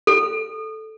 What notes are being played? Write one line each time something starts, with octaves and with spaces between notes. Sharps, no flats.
A4